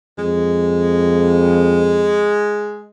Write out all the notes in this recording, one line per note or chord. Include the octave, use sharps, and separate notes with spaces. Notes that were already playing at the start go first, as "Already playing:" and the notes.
F2 G#3